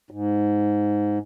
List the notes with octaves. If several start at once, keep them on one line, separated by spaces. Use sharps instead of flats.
G#2